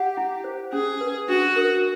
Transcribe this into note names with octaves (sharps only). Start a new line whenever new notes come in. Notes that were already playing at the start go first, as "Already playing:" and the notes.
Already playing: G4 F#5
E4
C5
C#4 G#4
B4
D4 F#4
A#4